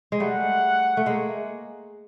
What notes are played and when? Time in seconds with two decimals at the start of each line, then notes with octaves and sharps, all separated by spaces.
0.12 G#3
0.20 G3 A3 F#5
0.97 A3
1.06 G#3 A#3